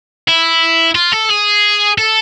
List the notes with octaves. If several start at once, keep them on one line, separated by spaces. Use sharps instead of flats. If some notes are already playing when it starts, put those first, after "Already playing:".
E4
F4
A4
G#4
A4